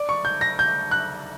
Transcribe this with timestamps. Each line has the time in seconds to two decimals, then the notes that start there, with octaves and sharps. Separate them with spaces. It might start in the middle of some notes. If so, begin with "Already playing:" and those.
Already playing: D5
0.09 C#6
0.25 G6
0.41 A#6
0.59 G6
0.91 F#6